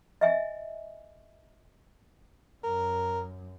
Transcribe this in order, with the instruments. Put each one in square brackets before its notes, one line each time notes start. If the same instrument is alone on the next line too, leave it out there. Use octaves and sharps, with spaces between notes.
[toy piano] D#5 E5 G#5
[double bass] F#2 [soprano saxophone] A#4